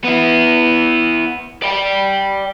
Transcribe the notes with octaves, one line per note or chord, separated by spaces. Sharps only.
B3 E4
D5 G5